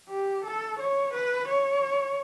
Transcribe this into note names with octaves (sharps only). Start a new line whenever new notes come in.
G4
A4
C#5
B4
C#5